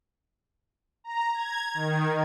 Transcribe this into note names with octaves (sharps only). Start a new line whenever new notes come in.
A#5
G#6
D#3